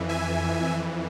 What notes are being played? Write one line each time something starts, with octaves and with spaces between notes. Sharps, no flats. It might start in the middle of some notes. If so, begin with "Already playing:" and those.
Already playing: F2 E3
E5 G#5